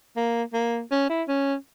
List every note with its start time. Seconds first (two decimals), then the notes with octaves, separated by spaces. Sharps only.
0.17 A#3
0.54 A#3
0.92 C#4
1.09 E4
1.28 C#4